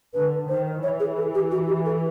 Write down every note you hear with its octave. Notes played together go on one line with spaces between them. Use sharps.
D3 B4
D#3 C5
E3 C#5
G#4
A4
G4
F#4
G4
A4